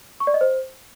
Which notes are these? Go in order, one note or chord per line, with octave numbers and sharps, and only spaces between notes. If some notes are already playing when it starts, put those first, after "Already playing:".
C#6
D5
D#5
C5